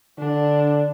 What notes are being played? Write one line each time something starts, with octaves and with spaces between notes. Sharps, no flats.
D3 D4